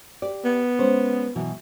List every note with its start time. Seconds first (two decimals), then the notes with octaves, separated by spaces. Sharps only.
0.22 G4 D5
0.45 B3
0.79 G#3 C#4 C5
1.35 B2 E3 F#3